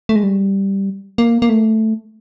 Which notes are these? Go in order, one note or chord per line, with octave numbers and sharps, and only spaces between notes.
A3
G#3
G3
A#3
A#3
A3